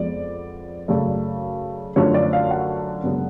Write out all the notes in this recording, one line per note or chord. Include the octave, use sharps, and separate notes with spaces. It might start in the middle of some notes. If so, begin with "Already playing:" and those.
Already playing: F2 F3 G#3 B3 D5
F#2 C#3 F#3 A3 D5
F#2 D3 F3 A3 C#4 C#5
D5
F5
F#5
F#2 C#3 G#3 B3 D4